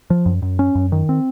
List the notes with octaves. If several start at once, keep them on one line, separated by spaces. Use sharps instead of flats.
F3
F#2
F#2
C#4
F#2
D#3
C4